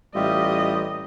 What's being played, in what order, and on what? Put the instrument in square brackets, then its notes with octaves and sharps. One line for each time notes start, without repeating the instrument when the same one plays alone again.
[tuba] A1 [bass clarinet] G3 [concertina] F4 G4 E5 [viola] D#5